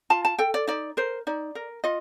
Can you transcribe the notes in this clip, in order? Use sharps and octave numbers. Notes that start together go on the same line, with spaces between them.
F4 A5
A5
A4 G5
D5
D#4 D5
A#4 C5
D#4 D5
A#4
F4 D#5